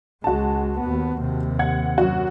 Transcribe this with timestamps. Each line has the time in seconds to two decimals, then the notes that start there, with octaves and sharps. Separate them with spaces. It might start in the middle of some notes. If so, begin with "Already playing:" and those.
0.24 C#2 G#3 F#4 A5
0.80 D#2 B3
1.19 D#2 C3
1.59 F#5 G#6
1.98 F#2 F#4